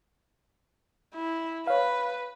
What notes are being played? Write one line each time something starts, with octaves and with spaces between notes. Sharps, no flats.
E4
B4 C#5 F5